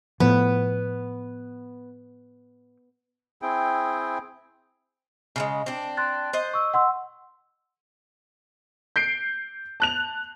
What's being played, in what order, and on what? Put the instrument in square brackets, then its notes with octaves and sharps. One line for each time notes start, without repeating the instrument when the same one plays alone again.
[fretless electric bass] A2 F3 [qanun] B3
[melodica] C4 E4 G#4 G5
[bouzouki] C#3 F#3 G#3
C4 D4
[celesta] C6 F#6 A6
[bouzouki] C5 D#5
[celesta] C#6 E6
F#5 C6 E6
[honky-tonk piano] G6 C7 D7
A5 F#6 F7